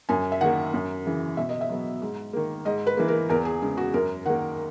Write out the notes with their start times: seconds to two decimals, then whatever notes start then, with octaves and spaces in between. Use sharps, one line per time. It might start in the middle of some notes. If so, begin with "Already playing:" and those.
0.09 F#2 G#5
0.32 E5
0.41 D#3 A#3 F#5
0.74 F#2
1.05 C#3 E3
1.37 B2 E5
1.49 D#5
1.61 E5
1.70 F#3 B3
2.02 G#2
2.33 D#3 A#3
2.65 G#2 D#5
2.87 B4
2.97 E3 A#3
3.08 A#4
3.29 E2 A#4
3.45 G#4
3.62 C#3 G#3
3.77 F#4
3.94 F#2 A#4
4.26 D#3 A#3 F#5